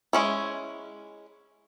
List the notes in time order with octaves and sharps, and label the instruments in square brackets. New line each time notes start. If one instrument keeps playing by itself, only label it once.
[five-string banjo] G#3 C#4 E4